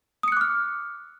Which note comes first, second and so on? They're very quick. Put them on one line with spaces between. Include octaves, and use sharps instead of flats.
D#6 C#7 F#6 D6 F6